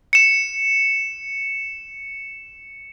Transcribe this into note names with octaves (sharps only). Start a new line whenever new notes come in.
C#7 E7